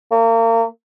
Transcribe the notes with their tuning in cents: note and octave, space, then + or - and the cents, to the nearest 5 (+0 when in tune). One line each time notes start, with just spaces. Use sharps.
A#3 -35